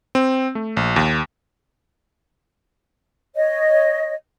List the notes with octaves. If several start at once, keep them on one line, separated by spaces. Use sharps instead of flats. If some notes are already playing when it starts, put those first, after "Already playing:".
C4
A3
A#1
D#2
C#5 D#5